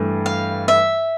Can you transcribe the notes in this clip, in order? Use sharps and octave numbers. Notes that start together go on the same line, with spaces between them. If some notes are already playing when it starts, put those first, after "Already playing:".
Already playing: G2 E3 A3
F5
E5